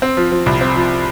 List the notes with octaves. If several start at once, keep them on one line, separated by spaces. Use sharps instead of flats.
C4
F3
F3
C2
C4
F3